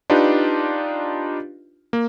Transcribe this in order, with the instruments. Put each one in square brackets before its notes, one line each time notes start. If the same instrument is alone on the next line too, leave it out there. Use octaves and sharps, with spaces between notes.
[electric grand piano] D4 D#4 F4 G4 B4
A#3